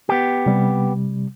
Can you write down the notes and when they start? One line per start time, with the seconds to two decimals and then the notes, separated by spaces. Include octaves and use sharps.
0.09 B3 G4
0.46 C3 G3